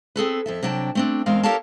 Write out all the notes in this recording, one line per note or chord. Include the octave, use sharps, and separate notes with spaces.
C4 G#4 A4 B4
F2 A4 E5
C3 F#3 D4 G5 A5
A3 C4 D4
E2 G#3 C4 A#4 F5
G4 A4 A#4 C#5 F5 A5